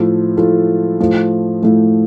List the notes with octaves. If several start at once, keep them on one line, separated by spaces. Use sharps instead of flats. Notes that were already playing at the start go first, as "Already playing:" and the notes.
Already playing: A2 F3 A3 F4 A4
A2 F3 A3 F4 A4
A2 F3 A3
A2 F3 A3